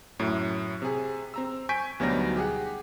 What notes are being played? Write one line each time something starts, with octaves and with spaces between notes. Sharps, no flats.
F#2 A2
C3 G#4
C4 A#5 E6
G#5 C#6 G6 G#6 B6 D7
D2 B2 F#3 G3 D#4 A#6
G4 G#4 F#5